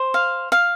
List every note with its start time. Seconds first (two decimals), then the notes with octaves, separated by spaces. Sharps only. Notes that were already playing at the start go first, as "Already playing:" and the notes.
Already playing: C5
0.14 F5
0.52 F5